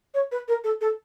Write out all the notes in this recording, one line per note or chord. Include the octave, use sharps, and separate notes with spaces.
C#5
B4
A#4
A4
A4